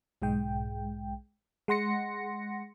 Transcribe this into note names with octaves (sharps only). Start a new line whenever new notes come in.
B1 G#2 G#3 G5
G#3 F#5 C6 A#6 C#7